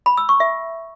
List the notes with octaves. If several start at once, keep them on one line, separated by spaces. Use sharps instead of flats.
B5
E6
C#6
E5